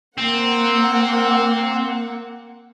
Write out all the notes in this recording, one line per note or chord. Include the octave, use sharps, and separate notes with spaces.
A#3 C4 F#5